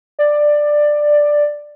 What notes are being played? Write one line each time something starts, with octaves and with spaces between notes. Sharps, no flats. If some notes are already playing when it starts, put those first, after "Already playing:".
D5